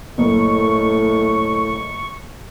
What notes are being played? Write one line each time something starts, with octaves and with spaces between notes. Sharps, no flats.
F#1 A2 C#6